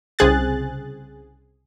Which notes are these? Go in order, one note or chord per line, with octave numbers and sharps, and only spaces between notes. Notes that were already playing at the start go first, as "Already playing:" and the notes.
C2 C#3 C4 G#4 F#6 A6